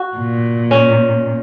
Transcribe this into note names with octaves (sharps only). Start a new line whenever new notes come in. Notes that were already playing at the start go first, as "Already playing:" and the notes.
Already playing: F#4
A#2
C#4